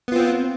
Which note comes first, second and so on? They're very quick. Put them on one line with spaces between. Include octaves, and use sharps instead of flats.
B3 F4 C4